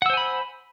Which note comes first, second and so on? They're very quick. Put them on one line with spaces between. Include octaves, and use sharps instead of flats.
F#5 E6 C5 G#5 B5